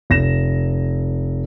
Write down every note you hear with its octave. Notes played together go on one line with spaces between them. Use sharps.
F1 A#6 E7